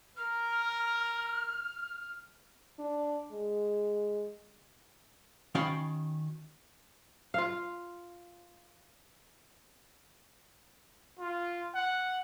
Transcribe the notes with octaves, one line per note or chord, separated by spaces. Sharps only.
A#4 F6
D4
G#3
D#3 C#4 F#4 F5 G5 B5
F4 F5
F4
F#5